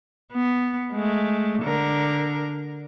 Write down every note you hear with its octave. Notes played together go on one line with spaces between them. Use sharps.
B3
G#3 A3
D3 A#4